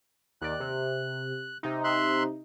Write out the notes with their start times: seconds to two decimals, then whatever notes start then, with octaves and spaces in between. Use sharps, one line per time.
0.41 D#2 D5 F#6
0.60 C3
1.63 C3 D#4
1.84 E5 C6 F#6